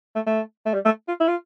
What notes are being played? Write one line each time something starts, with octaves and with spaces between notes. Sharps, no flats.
A3
A3
A3
G3
A3
F4
E4
F4